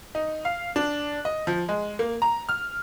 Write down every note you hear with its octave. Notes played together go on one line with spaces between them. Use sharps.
D#4
F5
D4
D#5
F3
G#3
A#3
A#5
F6